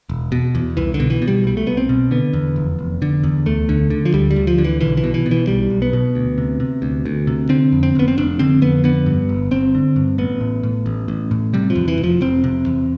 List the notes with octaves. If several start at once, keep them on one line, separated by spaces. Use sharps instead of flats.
E1
B2
E2
C2 E3
D3
B2
E3
B2
G3
C2 G3
A3
C2 B3
C4
B2
D3 B3
E2
F1
F1
D3
E2
D2 A3
D3
D3
F3
D2 G3
G3
D2
F3
D3
E3
B1 E3
E3
B2
E3
B2
E3
B1 G3
B1
B3
B2
D2
C3
C3
D2
D2
C3
D3 C4
F2
C4
F1 B3
C4
F1 D4
D3 C4
F2 B3
D3 B3
G2
G1
G1 C4
D3
G2
A1 B3
A2
A2
A1
A1
A2
C3 G3
F3
E2
E3
F1
F3
F1 C4
C3
E2